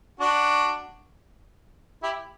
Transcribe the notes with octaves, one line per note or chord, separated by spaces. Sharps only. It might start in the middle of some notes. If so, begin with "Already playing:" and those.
D4 F#4
E4 G4